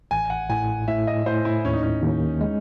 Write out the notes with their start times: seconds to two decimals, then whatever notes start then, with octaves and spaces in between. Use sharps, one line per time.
0.11 A1 G#5
0.30 F#5
0.50 A2 G#5
0.88 A2 E5
1.07 D#5
1.26 A2 C5
1.45 E4
1.65 D#2 C#4
1.73 D#4
1.83 C#4
2.03 D#2
2.41 G#3